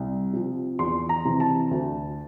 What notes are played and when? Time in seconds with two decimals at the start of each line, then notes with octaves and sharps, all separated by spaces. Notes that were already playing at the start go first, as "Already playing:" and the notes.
Already playing: C2
0.33 C3 F3
0.79 E2 C6
1.09 A#5
1.25 C3 E3
1.40 A5
1.71 D2